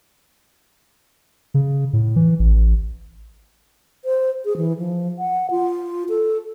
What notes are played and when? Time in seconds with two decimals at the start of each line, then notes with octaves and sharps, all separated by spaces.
1.54 C#3
1.93 A2
2.16 E3
2.39 A1
4.05 C5
4.45 G#4
4.57 E3
4.78 F3
5.19 F#5
5.51 F4
6.09 A4